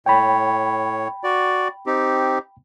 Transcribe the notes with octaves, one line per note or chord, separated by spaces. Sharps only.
A2 C#5 G5 B5
F#4 D5
C4 D#4 G4